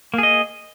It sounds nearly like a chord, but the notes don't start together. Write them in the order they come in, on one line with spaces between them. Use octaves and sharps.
A#3 G#4 D#5